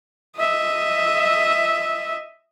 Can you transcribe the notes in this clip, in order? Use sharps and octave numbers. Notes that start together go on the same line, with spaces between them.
D#5 E5